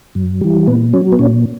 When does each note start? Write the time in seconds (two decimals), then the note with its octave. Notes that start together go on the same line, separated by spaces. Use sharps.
0.15 F#2
0.41 E3 G3
0.67 A#2 B3
0.93 F#3 C#4
1.12 B3
1.19 A#2 C#4